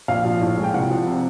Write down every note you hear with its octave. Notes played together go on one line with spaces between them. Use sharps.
A#1 F5
F3
A2
G#3
G5
C2 F#5
F3
C3